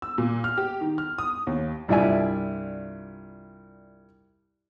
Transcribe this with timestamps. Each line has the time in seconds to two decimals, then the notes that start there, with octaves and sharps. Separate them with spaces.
0.02 E6
0.18 A#2
0.44 F6
0.58 G4
0.81 D#3
0.98 F6
1.18 D#6
1.47 D#2
1.88 C2 G2 F4 D5 E5 G#5